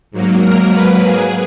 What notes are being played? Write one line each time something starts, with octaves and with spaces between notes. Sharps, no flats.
G#2 F#3 A#3
A#4
B4
G#4